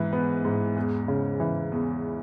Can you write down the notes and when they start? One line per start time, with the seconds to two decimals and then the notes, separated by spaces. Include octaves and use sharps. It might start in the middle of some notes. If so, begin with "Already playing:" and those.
Already playing: G#2 E3
0.13 B3
0.45 G#2
0.76 E2
1.08 C#3
1.40 E3
1.72 E2